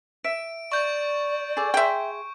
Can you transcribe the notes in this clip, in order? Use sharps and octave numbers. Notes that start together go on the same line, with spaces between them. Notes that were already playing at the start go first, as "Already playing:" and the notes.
E5 D7
D5 C#6 G6
G#4 A4 D6
G#4 E5 G5 C6